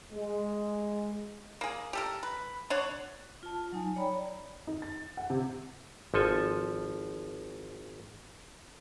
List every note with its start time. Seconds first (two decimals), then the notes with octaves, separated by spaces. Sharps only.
0.12 G#3
1.61 A#3 G#4
1.93 G4 A4 A#4
2.23 B4
2.70 D4 C#5 F#5
3.43 F4 A5
3.72 F#3 D#4 G#5
3.96 C#5 D5 G5 A#5 B5
4.67 D#4
4.82 A6
5.17 F#5
5.30 C3
6.14 G#1 F3 A4 G#5